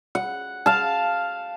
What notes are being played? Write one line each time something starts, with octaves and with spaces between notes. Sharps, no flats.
F#5
F5 A5